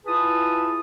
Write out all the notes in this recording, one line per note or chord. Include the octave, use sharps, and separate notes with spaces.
E4 F4 G#4 B4 A5 D#6